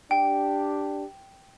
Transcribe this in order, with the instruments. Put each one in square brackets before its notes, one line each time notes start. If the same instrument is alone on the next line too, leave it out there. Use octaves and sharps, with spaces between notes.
[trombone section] D4 G4 [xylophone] G5